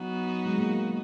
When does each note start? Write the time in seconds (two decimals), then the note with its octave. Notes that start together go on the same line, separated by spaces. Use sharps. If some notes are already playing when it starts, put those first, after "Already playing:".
Already playing: F#3 B3 D#4 F#4
0.45 G#3
0.58 A#3